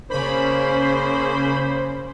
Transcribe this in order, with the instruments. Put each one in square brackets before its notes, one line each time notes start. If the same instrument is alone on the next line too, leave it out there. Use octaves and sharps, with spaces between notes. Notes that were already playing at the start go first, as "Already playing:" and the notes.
[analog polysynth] C#3 B5 [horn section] A#3 C#4 C5